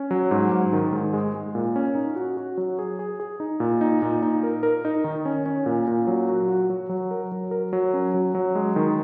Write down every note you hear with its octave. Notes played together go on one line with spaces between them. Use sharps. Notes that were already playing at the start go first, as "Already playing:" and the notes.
Already playing: C#4
F#3
G#2
G#2
D#3
G#2
G#3
G#3
A#2
C#4
D#4
F#4
F#4
F#3
G#4
G#4
G#4
D#4
A#2
D#4
A#2
D#4
A#4
A#4
D#4
D#3
C#4
C#4
A#2
A#2
F#3
F#4
F#4
F#3
F#3
A#4
F#3
A#4
F#3
C#4
F#3
F#3
G#3
D#3